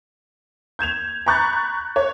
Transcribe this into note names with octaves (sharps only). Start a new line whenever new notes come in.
G6 G#6 E7 F7
A#5 B5 C#6 F#6 G6 A6
C#5